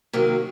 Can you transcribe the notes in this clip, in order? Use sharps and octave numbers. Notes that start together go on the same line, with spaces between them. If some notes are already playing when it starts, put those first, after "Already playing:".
C3 D#3 F#3 A#3